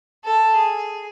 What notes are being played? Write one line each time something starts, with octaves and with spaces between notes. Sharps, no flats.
A4
G#4